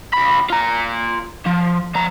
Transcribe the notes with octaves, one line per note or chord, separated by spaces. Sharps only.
C#2 B5
F4 A#5
F3
F3 A#5